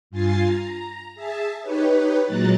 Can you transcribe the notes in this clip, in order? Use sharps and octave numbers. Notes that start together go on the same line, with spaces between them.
G2 F4 G#5 A6 C7
A#5
G#4 E5 A5
D#4 G4 B4 C#5
A#2 F#3 G#3 A#5 F#6 A6